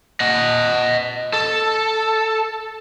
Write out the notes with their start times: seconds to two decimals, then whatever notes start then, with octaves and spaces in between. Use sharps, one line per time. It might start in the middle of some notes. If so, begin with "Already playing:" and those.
0.20 D#5 F#5
1.33 A4